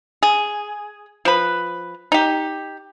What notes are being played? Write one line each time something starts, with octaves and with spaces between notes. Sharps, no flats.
G#4
F3 B4
D#4 G4